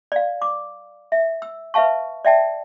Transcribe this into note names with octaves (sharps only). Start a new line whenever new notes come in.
D5 F5
D6
E5
E6
B4 E5 F5 A5 C#6
D5 E5 G5 A5